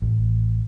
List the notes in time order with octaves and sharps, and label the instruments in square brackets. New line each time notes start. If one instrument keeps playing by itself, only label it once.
[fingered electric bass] A1